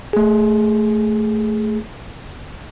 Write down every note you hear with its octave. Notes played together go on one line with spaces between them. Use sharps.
A3 G#4